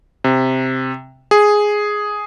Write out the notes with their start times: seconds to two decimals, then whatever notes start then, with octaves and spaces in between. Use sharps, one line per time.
0.24 C3
1.31 G#4